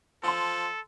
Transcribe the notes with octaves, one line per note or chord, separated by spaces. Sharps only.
F3 A4 C6 E6